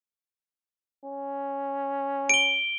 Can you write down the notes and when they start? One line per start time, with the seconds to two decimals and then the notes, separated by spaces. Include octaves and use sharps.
1.06 C#4
2.30 D7 G7